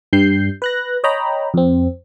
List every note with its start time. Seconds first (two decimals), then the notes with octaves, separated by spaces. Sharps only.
0.13 G2 G3 G6 C7
0.62 B4 F#6 A#6
1.04 C#5 D#5 G5 A#5 B5
1.54 F2 C4